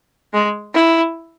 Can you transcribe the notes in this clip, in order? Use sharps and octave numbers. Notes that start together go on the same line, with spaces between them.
G#3
E4